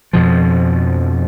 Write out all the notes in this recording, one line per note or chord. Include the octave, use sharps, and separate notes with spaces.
F2 B2 F3